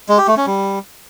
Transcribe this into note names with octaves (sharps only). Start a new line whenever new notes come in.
G#3
G4
A3
C#4
G3